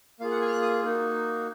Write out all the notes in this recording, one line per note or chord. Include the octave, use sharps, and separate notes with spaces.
A#3 F4 G#4 F5
F#5
G#5
F6
F#6
D#6
A#3 D#4 F#4